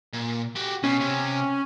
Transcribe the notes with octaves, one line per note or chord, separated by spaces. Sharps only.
A#2
F#4 G4
B2 C#4
C3